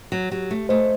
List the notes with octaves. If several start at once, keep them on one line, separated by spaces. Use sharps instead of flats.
F#3
F#3 G4
A3
A3 C5 D#5